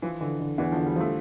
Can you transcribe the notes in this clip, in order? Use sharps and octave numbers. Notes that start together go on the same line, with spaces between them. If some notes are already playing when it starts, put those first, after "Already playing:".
E3 F3
D3 E3
D3
E2 E3
F3
D3
G3
F3 A3